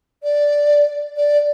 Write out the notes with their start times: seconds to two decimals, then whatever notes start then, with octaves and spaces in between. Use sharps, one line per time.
0.23 D5
1.17 D5